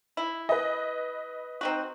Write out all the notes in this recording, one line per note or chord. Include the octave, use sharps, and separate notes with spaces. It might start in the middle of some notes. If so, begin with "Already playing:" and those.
E4
B4 D#5
C4 D#4 F#4